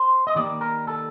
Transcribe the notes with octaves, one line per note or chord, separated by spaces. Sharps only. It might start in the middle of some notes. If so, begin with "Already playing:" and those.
Already playing: C5
D#5
D#3 G3 A#3 D5
A#4
A4